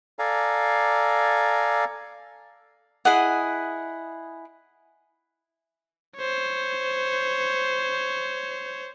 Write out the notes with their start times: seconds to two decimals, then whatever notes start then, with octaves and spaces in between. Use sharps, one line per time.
0.19 A4 D5 F5 G#5 A#5
3.05 E4 G#4 D#5 F#5
6.17 C5 C#5